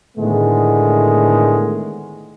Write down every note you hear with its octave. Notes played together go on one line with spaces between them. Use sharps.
A2 D3 D#3 G#3 A3 B3